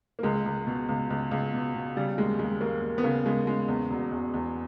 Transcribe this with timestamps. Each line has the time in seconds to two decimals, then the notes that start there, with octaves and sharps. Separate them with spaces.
0.19 A#3
0.23 C#2 G#3
0.46 C#2
0.67 B2
0.89 C#2
1.10 C#2
1.31 C#2
1.53 B2
1.75 B2
1.96 C#3 G3
2.18 D#2 G#3
2.39 D#2 G#3
2.60 D#2 A#3
2.82 D#2
2.98 B3
3.03 C#3 A#3
3.26 C#3 G#3
3.47 C#3 G#3
3.68 E2
3.90 E1
4.12 E2
4.34 E2